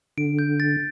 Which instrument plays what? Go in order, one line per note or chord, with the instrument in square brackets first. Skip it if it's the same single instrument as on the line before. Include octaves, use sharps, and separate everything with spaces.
[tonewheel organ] D3 [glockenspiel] D7
[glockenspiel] G6
A6